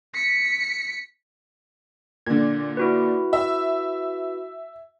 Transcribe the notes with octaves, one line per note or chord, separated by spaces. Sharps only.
B6 C#7
A#2 D3 G#6
E4 F#4 B4
E5